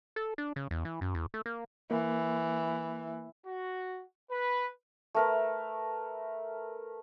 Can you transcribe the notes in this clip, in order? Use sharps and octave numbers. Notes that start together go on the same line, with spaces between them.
A4
D4
C#3
E2
E3
F#2
E2
A3
A#3
E3 A#3
F#4
B4
A3 A#4 B4